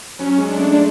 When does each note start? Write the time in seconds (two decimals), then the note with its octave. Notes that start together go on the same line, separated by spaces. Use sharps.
0.19 F#3 C#4
0.38 G#3
0.48 D4
0.58 A3
0.72 G#3 D4